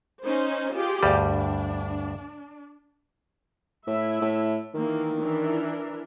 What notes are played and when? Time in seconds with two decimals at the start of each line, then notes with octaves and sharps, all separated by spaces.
0.23 C#4 D#4 C5
0.73 F4 G4 G#4
1.03 D2 G2 G3 D4
3.87 A2 E4 E5
4.21 A2
4.74 D#3 E3 A#3
5.19 E3 D4 A#4